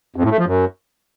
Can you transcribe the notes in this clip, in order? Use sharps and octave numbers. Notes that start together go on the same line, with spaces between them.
F2
A2
A3
F3
F#2